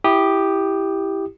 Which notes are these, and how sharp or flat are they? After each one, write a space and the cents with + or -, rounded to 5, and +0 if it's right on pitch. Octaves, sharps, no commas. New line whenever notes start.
E4 +0 G4 +0 D#6 -20